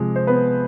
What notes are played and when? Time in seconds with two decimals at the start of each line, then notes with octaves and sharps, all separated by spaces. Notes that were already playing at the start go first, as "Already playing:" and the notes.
Already playing: C3 F3 G#3
0.16 C5
0.27 B3 B4